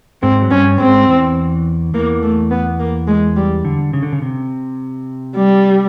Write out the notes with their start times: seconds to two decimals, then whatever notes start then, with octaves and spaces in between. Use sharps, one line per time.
0.22 G#2 G#3 C4
0.41 F#3
0.51 G2 G3 C#4
0.80 G#2 G#3 C4
1.08 E2 E3
1.94 E2 E3 A#3
2.23 A3
2.51 B3
2.80 A#3
3.08 G#3
3.37 G3
3.65 D3
3.93 C#3
4.03 D3
4.12 C#3
4.22 C3
5.36 G3